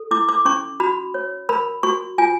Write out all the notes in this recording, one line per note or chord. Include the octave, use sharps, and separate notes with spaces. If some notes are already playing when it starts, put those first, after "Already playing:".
Already playing: A4
E4 D6
D6
C#4 C#6
F#4 B5
C#5
A#4 B5
F#4 C#6
F4 G#5